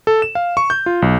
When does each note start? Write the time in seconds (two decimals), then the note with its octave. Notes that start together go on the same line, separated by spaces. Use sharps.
0.07 A4
0.22 E7
0.35 F5
0.57 C#6
0.70 G6
0.86 F4
1.02 B1